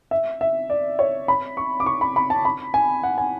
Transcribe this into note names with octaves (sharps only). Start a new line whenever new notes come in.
E5
E5
D5
C#5
B5
C#6
D6
C#6
B5
B5
A5
B5
G#5
F#5
G#5